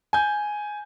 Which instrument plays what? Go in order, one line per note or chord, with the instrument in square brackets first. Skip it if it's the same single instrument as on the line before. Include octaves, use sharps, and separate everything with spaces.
[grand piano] G#5 G6